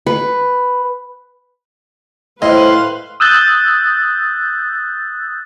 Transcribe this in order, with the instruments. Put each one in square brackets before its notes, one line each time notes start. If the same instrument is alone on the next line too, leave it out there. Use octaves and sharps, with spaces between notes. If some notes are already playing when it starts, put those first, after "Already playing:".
[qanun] B4
[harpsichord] A2 [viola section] B4 C5 F5 [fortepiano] D#5 [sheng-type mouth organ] C6
[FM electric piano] D#6 E6 F#6 G6 A6